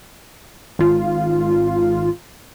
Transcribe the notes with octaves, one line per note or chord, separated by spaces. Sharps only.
G#1 F4